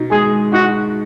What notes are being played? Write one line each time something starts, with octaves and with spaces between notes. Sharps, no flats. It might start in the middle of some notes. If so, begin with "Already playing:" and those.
Already playing: B2 D#4
G#3 G#4
D#4 F#4